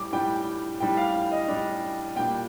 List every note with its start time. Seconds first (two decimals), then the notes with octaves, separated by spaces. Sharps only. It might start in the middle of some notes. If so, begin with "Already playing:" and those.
Already playing: A2 G3 D6
0.12 A2 G3 D4 G5
0.80 A2 G3 D4 G5
0.97 F5
1.32 D#5
1.48 A2 G3 D4
2.16 A#2 G3 D4 G5